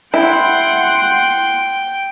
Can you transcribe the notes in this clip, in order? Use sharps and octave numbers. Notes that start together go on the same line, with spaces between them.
E4 F#5 G5 C6